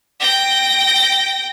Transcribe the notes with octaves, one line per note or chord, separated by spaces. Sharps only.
G5 A#6